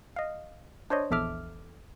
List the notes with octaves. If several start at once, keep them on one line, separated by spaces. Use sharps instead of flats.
D#5 F5
D4 C5 C#5 D#5
A#1 E2 A4 E5 D6 F6